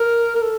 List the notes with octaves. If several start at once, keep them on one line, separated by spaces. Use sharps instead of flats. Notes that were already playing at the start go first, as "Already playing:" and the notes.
Already playing: A#4
A#4
A4